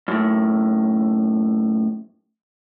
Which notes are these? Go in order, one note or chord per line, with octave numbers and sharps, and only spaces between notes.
F#2 A2